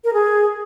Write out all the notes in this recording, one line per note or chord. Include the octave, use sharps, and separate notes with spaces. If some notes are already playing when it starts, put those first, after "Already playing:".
A#4
G#4